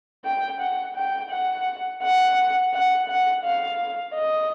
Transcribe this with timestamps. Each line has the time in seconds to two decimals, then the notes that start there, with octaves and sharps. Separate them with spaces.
0.25 G5
0.60 F#5
0.95 G5
1.31 F#5
2.03 F#5
2.73 F#5
3.08 F#5
3.45 F5
4.15 D#5